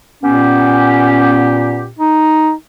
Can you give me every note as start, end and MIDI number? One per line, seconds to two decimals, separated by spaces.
0.24 1.92 46
0.24 1.85 59
0.24 1.85 61
0.24 1.85 67
1.99 2.52 63